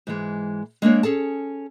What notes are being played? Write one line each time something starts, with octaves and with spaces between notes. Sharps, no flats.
G#2 E3 G#3
G#3 A#3 D4 C#5
C#4 G#4 A4 A5